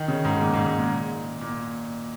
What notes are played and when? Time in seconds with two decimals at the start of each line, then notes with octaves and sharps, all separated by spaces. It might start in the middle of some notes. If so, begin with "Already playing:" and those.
Already playing: D#3
0.08 C#3
0.25 G#2
0.37 G#2
0.41 A#2
0.54 G#2
0.66 G#2
0.79 A#2
1.41 A#2